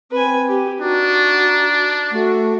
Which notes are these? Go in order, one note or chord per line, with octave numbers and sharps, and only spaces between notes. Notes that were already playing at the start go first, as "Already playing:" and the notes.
C4 B4 G#5
G4
D4 D#4 F#4
A3 F#4